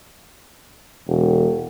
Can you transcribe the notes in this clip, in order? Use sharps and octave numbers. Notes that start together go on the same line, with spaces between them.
E1